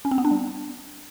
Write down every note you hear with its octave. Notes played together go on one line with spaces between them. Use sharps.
C#4
C4
B3
D4
G3